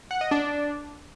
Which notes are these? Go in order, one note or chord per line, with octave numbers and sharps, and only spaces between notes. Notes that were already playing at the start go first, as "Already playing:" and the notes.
F#5
D#5
D4